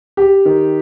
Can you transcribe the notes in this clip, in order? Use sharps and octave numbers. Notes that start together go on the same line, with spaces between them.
G4
D#3